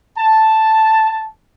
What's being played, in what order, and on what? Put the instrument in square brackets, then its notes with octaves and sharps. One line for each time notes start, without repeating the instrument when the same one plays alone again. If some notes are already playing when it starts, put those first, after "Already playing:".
[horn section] A5